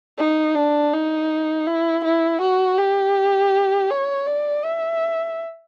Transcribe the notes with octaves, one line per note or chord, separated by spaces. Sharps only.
D#4
D4
D#4
E4
E4
F#4
G4
C#5
D5
E5